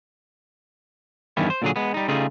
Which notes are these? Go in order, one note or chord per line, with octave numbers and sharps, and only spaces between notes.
E2 G2 D#3 G3 C#4 E4
C5
A#2 D3 F#3 G#4
G#3 B3
G3 D#4
C#3 G3 A3 D#4 F4 G#4